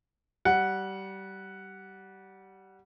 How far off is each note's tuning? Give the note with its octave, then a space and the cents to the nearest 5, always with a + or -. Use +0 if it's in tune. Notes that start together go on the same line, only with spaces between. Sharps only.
G3 -20 F#5 +0